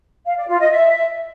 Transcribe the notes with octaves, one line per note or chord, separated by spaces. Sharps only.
F5
D5
F4
D#5
E5